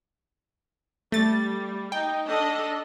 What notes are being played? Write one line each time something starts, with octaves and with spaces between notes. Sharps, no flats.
G3 A3 A6
D#4 G5
D4 A4 D#5